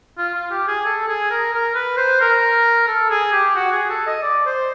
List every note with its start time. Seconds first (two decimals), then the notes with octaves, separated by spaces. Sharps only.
0.17 F4
0.34 F4
0.50 G4
0.67 G#4
0.85 A4
1.08 G#4
1.30 A#4
1.53 A#4
1.74 B4
1.97 C5
2.20 A#4
2.87 A4
3.10 G#4
3.32 G4
3.55 F#4
3.72 G#4
3.89 A4
4.06 D#5
4.22 D5
4.46 C5